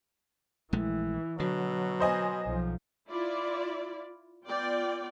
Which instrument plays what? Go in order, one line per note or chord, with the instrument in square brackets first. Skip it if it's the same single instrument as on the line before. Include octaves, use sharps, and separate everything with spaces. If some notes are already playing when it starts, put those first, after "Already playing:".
[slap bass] A#1 G#3 A3 [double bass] E3
[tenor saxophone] B2 [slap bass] D3 [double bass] F#3
[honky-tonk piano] C5 D#5 G#5
[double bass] B1 F3
[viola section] E4 F4 D5
B3 F4 D5 G5